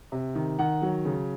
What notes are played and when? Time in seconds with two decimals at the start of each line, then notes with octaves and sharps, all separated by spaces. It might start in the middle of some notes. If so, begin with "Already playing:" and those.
0.12 C3
0.35 D#3
0.59 D#3 F#5
0.82 F#3
1.05 C#3